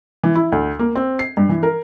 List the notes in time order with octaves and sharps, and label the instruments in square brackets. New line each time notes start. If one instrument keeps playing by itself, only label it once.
[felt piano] E3
E4
D2
A#3
C4
C7
G2
E3
A#4